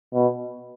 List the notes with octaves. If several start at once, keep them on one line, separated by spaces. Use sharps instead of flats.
B2